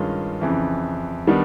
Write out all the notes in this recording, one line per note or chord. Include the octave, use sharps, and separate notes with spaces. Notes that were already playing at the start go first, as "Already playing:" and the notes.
Already playing: G2 D#3 G#3 C#4 F4
F2 C#3 E3
D#3 G3 B3 D4